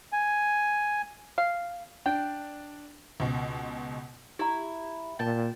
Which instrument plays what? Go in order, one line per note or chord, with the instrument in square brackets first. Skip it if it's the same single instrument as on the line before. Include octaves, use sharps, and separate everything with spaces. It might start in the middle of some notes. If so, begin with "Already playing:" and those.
[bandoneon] G#5
[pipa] F5
[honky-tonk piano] D4 [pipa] G5
[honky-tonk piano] C#2 B2
[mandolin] E4 [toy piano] G4 A#5
[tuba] A#2 [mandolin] G5 A5